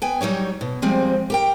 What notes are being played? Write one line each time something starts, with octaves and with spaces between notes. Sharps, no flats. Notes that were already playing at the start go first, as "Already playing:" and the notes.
B3 G5 G#5
F#3 G3 D#4 C#5
B2
F3 G3 G#3 C4
G4 A#4 G5